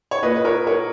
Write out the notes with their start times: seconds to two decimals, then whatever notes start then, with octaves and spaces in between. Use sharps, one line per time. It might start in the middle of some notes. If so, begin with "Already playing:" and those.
0.11 C#5
0.22 A#2 B4 D#5
0.35 B4
0.45 A#4 C#5
0.67 A#4 C#5